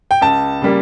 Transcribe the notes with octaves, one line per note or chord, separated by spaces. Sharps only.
G5
C#2 A5
C#3 G3 A#3